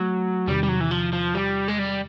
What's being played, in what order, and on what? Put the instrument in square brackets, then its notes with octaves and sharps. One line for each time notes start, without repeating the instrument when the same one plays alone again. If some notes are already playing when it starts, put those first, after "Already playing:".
Already playing: [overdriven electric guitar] F#3 [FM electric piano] A3
[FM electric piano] E2 C3 D#3 [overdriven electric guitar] G3
[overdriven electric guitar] G3
F#3
E3
F3
F3
G3
G#3
G3